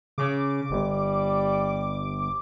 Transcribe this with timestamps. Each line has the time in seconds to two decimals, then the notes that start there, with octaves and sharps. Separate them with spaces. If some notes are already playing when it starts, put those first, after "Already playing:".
0.18 C#3 D6
0.70 G1 G3